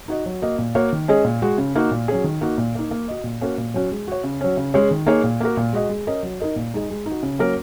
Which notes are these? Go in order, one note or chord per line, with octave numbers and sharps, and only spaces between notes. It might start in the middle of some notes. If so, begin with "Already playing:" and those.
D#4 F#4 D#5
F#3
A#3 F#4 D#5
A#2
A#3 F#4 C#5
D#3
G#3 C#4 G#4 D#5
A#2
G#3 F#4
C#3
A#3 D#4 F#4
A#2
F#3 C#4 G#4
D#3
A#3 D#4 F#4
A#2
A#3 D#4
A#3
F#4 D#5
A#2
A#3 C#4 F#4 A#4
A#2
F#3 C#4 F#4
G#3
F#4 C#5
C#3
F#3 C#4
C#3
G#3 C#4 G#4 C#5
D#3
A#3 D#4 G#4 C#5
A#2
A#3 F#4 A#4
A#2
G#3 F#4 D#5
G#3
C#4 A#4 D#5
F#3
D#4 A#4 D#5
A#2
G#3 D#4 G#4 D#5
G#3
D#4
F#4
C#3
F#3 A#3 C#4 A#4